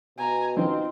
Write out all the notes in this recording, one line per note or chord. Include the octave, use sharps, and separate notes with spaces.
B2 G#5 A#5
D#3 F3 C4 C#4 D#4 F4